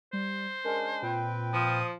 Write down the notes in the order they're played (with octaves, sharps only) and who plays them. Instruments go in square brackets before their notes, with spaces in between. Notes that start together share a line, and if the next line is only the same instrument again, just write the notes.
[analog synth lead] G3 [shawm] C5
[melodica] G#3 C#4 D4 [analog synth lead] A#4
[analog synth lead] A#2 [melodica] C4 B4 G5
[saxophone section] F3 [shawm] D#6